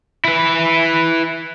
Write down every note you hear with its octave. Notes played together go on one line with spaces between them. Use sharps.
E4 B4